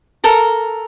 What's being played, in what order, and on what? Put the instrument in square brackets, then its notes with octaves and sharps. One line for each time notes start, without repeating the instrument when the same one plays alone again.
[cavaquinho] A4 A#4 A#5